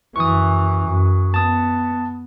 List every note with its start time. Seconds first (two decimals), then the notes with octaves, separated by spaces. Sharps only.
0.16 F#2 E3 C#6 D#6
0.84 F#2
1.34 B3 A5 D#6